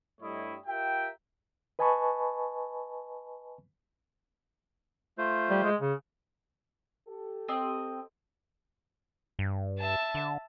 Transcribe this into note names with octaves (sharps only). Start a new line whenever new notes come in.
G2 G3 A3 E4 C#5 D#5
F4 G4 A#4 E5 G5
B4 D#5 G#5 A5 B5 C#6
A3 F4 C5
G3
G#3
C#3
G4 A4
C4 D#5
G2
E5 A5
D3